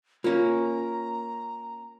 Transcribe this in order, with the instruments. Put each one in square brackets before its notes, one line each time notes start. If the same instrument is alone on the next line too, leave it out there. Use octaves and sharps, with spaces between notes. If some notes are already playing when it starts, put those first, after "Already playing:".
[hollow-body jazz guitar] A#3 C#4 [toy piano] F4 [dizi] A#5